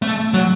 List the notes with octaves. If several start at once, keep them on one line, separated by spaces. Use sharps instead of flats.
A3
F#3